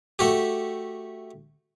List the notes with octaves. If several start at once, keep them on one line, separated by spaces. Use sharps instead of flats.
A3 F#4 G4